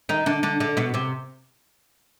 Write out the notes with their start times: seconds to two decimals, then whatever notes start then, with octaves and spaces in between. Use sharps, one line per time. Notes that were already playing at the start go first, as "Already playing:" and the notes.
0.09 D#3 D#4
0.26 D3 D4
0.43 D3 D4
0.60 D3 D4
0.77 B2 B3
0.94 C3 C4